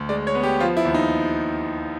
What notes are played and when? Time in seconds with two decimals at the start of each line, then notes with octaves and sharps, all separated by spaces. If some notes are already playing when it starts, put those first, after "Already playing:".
Already playing: D2
0.09 G#3 D5
0.27 C#5
0.35 B3
0.43 G4
0.60 F3 F4
0.77 E4
0.85 D#2
0.94 D#4